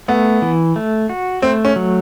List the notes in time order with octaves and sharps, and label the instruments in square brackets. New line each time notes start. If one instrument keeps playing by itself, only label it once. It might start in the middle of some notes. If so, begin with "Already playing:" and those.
[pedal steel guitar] A3 [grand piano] B3
[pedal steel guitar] E3
A3
F#4
[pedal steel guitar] A3 [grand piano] C4
[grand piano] C#4
[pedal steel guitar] F#3